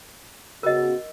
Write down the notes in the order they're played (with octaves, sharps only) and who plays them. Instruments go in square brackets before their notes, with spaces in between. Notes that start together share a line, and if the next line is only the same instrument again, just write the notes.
[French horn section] C#3 B3 F#4 [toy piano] A#4 D#5